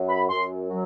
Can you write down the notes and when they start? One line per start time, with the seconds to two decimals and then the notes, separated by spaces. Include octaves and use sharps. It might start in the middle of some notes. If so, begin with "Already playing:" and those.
Already playing: F#2
0.09 B5
0.29 F#2 C6
0.70 F#3